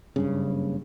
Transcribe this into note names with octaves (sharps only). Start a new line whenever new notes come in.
F#1 G2 C#3